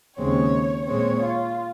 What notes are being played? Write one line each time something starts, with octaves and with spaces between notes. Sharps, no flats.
D#2 C#3 G#3 C4 C#5
A#2 G#3 C4 C#5
F4